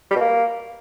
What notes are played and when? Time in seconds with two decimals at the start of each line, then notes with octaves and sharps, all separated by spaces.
0.11 G3
0.16 B2
0.21 A#3